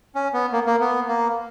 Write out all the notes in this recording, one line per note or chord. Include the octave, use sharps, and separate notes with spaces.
C#4
B3
A#3
A#3
B3
A#3